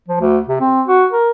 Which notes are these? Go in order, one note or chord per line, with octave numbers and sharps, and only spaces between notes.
F3
D2
C3
C4
F#4
A#4